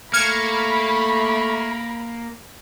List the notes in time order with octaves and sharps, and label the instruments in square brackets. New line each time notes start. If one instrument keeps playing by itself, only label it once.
[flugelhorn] A3 [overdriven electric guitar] A#3 [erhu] B5 [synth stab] F6 G#6 C#7